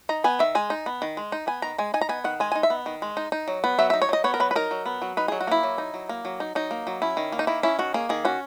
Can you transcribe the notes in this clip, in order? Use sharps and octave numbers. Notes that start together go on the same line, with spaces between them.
D#4 A#5
B3 G#5
D#3 E5
G#3 G#5
D#4
B3
D#3
G#3
D#4
B3 G#5
D#3 A#5
G#3 G#5
D#4 G#5
A#5
B3 G#5
D#3 F#5
G#3 G#5
D#4 G#5
E5
B3
D#3
G#3
D#4
D#4
F#3
B3
F#3 E5
D#4 E5
C#5
F#3 D#5
B3 C#5
A#4
F#3 B4
B4
D#4 A#4
F#3
B3
F#3
D#4 B4
F#3 G#4
F#4
A#3 E4
F#3
D#4
F#3
A#3
F#3
D#4
F#3 D#4
A#3
F#3
C#4 E4
D#3
A#3
D#4
D#3 E4
C#4 E4
D#3 F#4
A#3 G#4
D#3 G#4
C#4 F#4